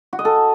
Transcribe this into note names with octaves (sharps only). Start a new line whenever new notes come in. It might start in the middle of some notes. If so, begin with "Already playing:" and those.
F#4
D#5
A4